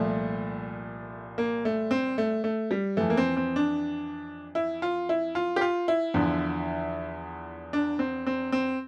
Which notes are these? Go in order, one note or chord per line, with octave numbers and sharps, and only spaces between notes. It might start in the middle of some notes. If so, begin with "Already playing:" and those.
Already playing: C2 A#2 F3 A3
A#3
A3
C4
A3
A3
G3
F2 E3 A3
A#3
C4
C4
D4
E4
F4
E4
F4
G4
F4
E4
E2 D3 F3
D4
C4
C4
C4